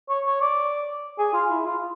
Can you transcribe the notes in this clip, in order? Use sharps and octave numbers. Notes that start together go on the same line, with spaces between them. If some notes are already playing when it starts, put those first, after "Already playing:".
C#5
C#5
D5
G#4
F4
E4
F4